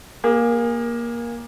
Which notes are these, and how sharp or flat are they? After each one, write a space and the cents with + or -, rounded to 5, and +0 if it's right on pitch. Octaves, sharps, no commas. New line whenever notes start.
A#3 +15 G#4 -25